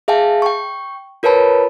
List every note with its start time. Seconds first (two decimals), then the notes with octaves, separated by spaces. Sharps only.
0.08 G#4 E5 F5 G5 A5
0.42 G5 C#6
1.23 F4 A#4 B4 C#5 A5 B5